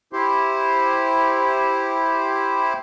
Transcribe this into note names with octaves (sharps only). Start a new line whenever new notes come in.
E4 G4 C5